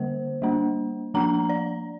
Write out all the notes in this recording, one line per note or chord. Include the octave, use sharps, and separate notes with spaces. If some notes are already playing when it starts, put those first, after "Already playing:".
Already playing: D3 G3 A#3 C5
G3 A#3 D4
F3 A#3 D4 A#5
D5